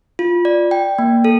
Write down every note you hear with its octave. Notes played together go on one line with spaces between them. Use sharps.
F4
D5
G5
A#3
A4